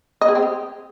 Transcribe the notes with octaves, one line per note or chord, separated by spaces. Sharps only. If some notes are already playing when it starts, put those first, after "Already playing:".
D#5
G#4
C4
G4